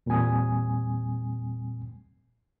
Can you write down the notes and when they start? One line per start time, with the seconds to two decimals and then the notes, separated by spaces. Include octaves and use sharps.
0.06 E2 A#2 G3 C4 G#5 D#6